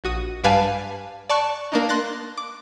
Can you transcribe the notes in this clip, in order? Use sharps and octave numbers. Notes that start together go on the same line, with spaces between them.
A#1 F#4 D#6
G2 G3 B4 F5 G#5 A5
D5 A5 C#6 F#6
A#3 D4 D#4
C6 F#6 A6 A#6
D6